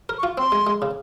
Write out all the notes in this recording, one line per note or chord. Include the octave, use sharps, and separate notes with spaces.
A#4
C#6
F4
C4 C6
G#3
G#3
C#3